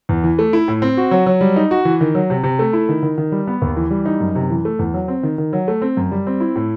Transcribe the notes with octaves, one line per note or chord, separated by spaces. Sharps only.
E2
E3
A3
E4
A2
C4
F#4
F#3
F#3
G3
D#4
F#4
E3
D#3
F#3
C3
C3
A3
E4
D#3
D#3
D#3
G3
B3
D#2
E3
G3
D#4
F#2
C3
E3
A3
E2
F#3
C4
D#3
D#3
F#3
A3
C4
F#2
G3
C4
E4
A2